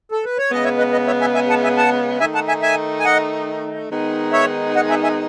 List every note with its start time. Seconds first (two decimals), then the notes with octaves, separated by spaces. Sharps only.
0.12 A4
0.25 B4
0.38 C#5
0.50 C#3 G#3 B3 D#5
0.64 C#5 E5
0.78 B4 D#5
0.92 B4 D#5
1.06 C#5 E5
1.21 E5 G#5
1.35 E5 G#5
1.50 F#5 A5
1.64 E5 G#5
1.77 F#5 A5
2.20 D#3 A3 D#4 E5 G#5
2.35 F#5 A5
2.48 E5 G#5
2.62 E5 G#5
3.00 G#5
3.05 D#5 F#5
3.90 D#3 G#3 B3 D#4
4.32 C#5 E5
4.76 D#5 F#5
4.90 E5 G#5
5.03 E5 G#5